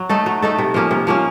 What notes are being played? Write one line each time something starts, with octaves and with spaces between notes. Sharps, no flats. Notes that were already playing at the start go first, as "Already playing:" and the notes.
Already playing: F#3
A3 D#4 A4
F#3
A3 D#4 A4
C3
F3 A#3 C#4
C3
F3 A#3 C#4